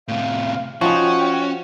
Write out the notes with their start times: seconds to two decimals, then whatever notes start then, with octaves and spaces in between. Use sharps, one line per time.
0.08 A2 C3 F5
0.81 F3 C#4 D#4 F#4 G5